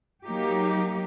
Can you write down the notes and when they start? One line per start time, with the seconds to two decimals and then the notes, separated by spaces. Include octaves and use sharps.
0.23 F#3 A#3 D#4 G4